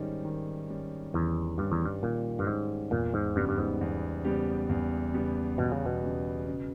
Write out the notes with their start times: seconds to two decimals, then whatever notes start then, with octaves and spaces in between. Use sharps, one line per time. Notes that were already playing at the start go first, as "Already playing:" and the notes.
Already playing: G#2 D#3 G3 C#4
0.25 D#3
0.69 G3 C#4
1.14 E2 D#3
1.58 G2 G3 C#4
1.72 E2
1.85 G2
2.03 A#2 D#3
2.39 G2
2.47 G#2 G3 C#4
2.91 E2 A#2
3.14 G#2
3.36 G2 C#3 G3 B3 G4
3.49 G2
3.58 G#2
3.81 E2
4.25 C#3 G3 B3 G4
4.69 E2
5.14 C#3 G3 B3 G4
5.58 E2 B2
5.72 C#3
5.86 B2
6.03 C#3 G3 B3 G4
6.48 C#3